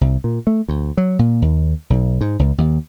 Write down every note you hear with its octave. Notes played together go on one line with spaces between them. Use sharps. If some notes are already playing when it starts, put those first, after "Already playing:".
C2
A#2
A3
D2
F#3
A#2
D#2
B1
G#2
C#2
D#2